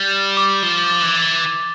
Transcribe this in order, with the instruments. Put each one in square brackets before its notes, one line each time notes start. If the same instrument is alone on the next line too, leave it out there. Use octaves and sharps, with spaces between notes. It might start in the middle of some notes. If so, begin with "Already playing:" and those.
Already playing: [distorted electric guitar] G3 [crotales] A6
[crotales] E7
D6
[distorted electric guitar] F3 [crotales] G7
[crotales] A6
[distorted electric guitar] E3
[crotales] A6